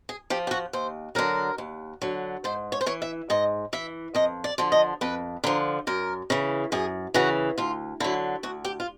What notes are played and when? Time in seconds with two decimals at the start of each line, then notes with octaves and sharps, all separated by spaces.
0.09 G#4
0.30 F3 G4
0.47 G4
0.51 F#4
0.73 D#2 C5
1.15 D3 F#3 A#4
1.58 D#2
2.02 D3 F#3
2.44 G#2 C5
2.72 C#5
2.81 C5
2.86 E3 C#5
3.02 E5
3.30 G#2 D#5
3.73 E3 E5
4.15 F2 D#5
4.44 D5
4.58 D3 F3
4.72 D#5
5.01 F2 B4
5.44 D3 F3 A#4
5.87 F#2 A#4
6.30 C#3 E3
6.72 F#2 G#4
7.14 C#3 E3 F#4
7.58 D2 F4
8.00 D3 F#3 E4
8.43 D2 F#4
8.65 G4
8.80 F4